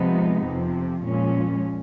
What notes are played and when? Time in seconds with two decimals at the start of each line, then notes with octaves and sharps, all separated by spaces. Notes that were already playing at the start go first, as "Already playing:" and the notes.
Already playing: C3 F3 G#3 B3 D#4
0.45 F2 C3 F3
1.01 A#2 F3 G#3 C#4